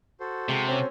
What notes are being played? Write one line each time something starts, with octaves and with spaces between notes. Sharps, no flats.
F#4 A4 C5
C3 G#3
C4 C#4